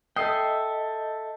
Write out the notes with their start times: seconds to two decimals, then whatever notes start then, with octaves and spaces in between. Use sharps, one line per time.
0.16 A4 D#5 E5 G5 D#6 C7